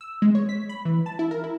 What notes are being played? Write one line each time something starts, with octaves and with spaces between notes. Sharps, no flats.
E6
G#3
C#5
B6
B5
E3
A5
E4
A#4
E4